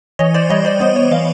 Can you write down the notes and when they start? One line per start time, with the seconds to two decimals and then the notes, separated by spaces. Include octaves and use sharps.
0.19 E3 C#5 D#5
0.34 C5 D5
0.49 G3 C#5 D#5
0.65 C5 D5
0.80 B3 C5
0.96 C#5
1.11 E3 D#5 F5